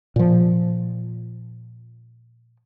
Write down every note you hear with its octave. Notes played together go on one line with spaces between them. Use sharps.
A#2 F3